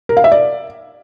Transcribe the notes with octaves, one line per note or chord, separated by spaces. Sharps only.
A#4
F5
E5
D5